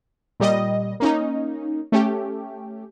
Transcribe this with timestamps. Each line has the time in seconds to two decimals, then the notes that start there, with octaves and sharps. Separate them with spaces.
0.40 A#2 G3 D#5
1.00 A#3 C#4 D#4
1.92 A3 C#4 G4